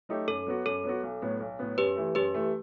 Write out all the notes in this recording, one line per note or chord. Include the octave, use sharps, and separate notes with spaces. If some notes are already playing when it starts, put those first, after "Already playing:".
F#3 A3 D#4 G4
F#2 A4
F#3 B3 F#4
F#2 A4
F#3 B3 F#4
B1
A2 F#3 B3
B1
A2 F#3 B3
F#2 G4 B4
E3 A3
F#2 G4 B4
E3 A3